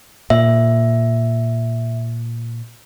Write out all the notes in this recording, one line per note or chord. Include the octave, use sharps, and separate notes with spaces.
A#2 E5